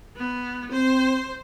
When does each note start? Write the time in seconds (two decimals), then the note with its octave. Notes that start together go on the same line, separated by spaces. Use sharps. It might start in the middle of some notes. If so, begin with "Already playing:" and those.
0.16 B3
0.72 C4 C5